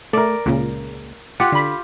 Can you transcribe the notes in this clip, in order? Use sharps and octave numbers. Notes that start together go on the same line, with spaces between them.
A3 A#4 D5
C#2 A#2 C#3
F4 G4 F#5
D3 B5